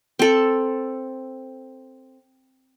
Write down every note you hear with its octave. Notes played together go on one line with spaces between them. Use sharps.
C4 A4